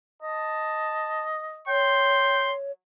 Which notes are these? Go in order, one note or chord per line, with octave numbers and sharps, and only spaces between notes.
D#5 A5
C#5 G5 C6